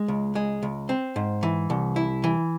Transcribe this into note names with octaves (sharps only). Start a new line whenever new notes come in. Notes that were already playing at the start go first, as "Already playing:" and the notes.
Already playing: G#3
C#2
G#3
C#2
C4
G#2
E3
C2
E4
E3